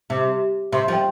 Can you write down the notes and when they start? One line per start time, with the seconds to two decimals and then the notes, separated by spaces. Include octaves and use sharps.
0.10 C3
0.72 C3 C6
0.88 F3
0.93 G5